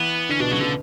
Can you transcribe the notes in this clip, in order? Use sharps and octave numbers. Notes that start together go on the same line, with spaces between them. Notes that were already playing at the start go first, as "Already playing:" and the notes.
Already playing: E3 B3
D3 C#4
B2 D4
C#3 F#3
B2 D3